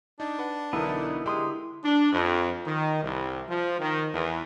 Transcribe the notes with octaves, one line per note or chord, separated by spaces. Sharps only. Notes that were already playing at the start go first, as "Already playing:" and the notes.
D4 D#4
B4 F#5
B1 D3 E3 B3 D#4 E4 A#4
D3 G#3 G4 C6 D#6
D4
F2
D#3
C2
F3
D#3
E2